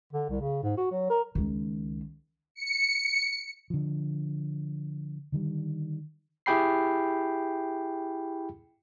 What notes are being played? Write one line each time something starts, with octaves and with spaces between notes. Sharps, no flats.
D3
C2
C#3
G#2
F#4
F#3
A#4
C#2 D#3
C#7
D3 F3
D3 D#3 G3
E4 G4 G#4 G5 B5 C7